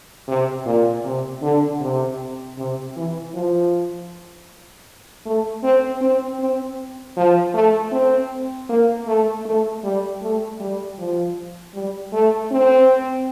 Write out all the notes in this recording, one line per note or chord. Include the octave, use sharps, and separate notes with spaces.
C3
A#2
C3
D3
C3
C3
E3
F3
A3
C4
C4
C4
F3
A3
C4
A#3
A3
A3
G3
A3
G3
F3
G3
A3
C4